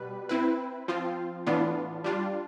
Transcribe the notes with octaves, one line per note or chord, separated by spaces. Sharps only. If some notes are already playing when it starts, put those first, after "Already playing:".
Already playing: B2 G3 B4
C4 E4 B4
F3 C4 F4
A2 E3 B3 D4 F4
G3 D4 F4